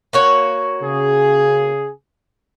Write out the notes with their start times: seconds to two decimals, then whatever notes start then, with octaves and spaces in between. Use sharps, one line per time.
0.13 A#3 F#4 C#5
0.82 C#3 G#4